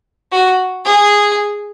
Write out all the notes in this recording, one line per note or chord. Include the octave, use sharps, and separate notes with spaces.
F#4
G#4